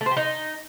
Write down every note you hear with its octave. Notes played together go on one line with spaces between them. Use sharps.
A3
C5
G4
D#4